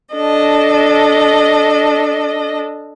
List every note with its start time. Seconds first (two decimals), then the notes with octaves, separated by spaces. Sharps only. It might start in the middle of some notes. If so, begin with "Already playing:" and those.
0.16 D4 A4 D#5